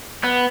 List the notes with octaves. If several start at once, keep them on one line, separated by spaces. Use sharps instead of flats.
B3